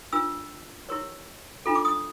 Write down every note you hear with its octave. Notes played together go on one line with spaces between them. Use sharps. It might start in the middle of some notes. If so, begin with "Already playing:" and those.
D4 F4 A#4 E6
E4 G4 A#4 C#5
D4 F4 A4
D6
D#6